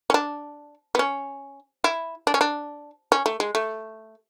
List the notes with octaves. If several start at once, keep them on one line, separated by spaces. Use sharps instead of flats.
C#4
D4
B3
C#4
E4
D4
C#4
D4
C#4
A3
G#3
A3